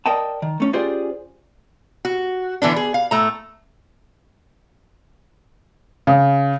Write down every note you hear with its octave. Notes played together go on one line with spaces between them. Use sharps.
A#4 D5 D#5 G5 A5
D#3
A3 C#4
C#4 F4 G4 G#4 C5 D5
F#4
D3 E3 B3 D4
G#4
F5
A2 A3 A#5
C#3